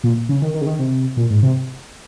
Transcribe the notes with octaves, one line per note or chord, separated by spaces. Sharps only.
A#2
C#3
D#3
D#3
C#3
D#3
C3
A#2
G#2
C3